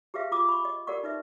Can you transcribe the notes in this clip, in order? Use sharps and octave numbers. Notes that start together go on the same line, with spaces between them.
G4 G#4 B4 E5 F5
F4 D6 D#6
B5 C#6
D#5
G4 A4 A#4 D5 F#5 C#6
D#4 B4 E5